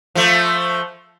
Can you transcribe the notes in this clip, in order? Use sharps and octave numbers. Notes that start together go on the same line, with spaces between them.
F3 A3